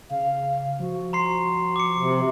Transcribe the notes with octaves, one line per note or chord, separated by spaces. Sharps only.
C#3 F5
F3 F#4
A#5 C6 C7
D6 C#7
C3